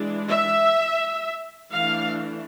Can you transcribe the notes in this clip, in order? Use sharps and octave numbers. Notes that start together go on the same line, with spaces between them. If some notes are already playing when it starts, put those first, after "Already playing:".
Already playing: E3 G#3 D4
E5
E3 A3 D4 F5